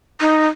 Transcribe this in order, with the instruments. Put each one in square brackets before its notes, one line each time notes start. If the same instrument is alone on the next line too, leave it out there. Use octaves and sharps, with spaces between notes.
[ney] D#4